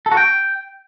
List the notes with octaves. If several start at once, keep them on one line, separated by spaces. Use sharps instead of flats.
A4
F#4
G5